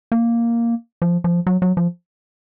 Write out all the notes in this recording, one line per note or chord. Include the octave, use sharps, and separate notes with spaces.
A#3
F3
F3
F#3
F#3
F3